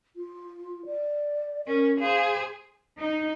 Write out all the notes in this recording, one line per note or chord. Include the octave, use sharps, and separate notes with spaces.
F4
D5
C#4 A#4
G#4 C5 F5
D#4